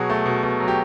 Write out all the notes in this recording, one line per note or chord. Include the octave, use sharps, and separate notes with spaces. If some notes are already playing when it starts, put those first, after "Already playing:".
Already playing: B2 F#3 F#4 G#4
A3
B2
B2
F#3
G4